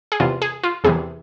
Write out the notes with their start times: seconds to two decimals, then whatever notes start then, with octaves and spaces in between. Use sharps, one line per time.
0.12 G#4
0.20 E2 C3 E3 F4
0.42 G#4
0.63 F4
0.84 E2 C3 E3 G#4